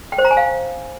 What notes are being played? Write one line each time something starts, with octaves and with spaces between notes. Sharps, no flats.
G5
C5
A#5
G#5
F5